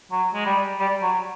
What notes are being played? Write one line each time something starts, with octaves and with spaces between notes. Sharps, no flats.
F#3
G#3
G3
G3
F#3